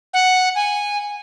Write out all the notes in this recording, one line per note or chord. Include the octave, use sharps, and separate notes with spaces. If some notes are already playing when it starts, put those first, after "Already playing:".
F#5
G#5